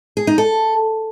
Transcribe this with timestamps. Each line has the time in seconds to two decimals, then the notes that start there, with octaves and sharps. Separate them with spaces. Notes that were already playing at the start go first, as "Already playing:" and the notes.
0.17 G#4
0.27 D#4
0.38 A4